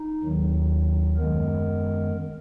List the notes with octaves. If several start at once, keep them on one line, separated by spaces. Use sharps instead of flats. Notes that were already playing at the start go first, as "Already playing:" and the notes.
Already playing: D#4
D#2 D#3 F#3
F#2 D#3 G#3 B3 A#4